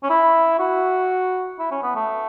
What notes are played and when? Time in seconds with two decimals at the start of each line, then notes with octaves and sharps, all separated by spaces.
0.03 C#4
0.10 E4
0.59 F#4
1.59 E4
1.71 C#4
1.83 B3
1.95 A3